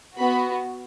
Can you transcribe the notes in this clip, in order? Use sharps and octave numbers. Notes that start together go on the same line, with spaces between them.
B3 F#4 B5